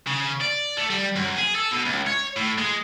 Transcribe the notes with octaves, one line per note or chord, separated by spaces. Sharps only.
C#3
D5
A3
G3
F#2
G#4
A4
B2
C#2
C#5
A2
G#3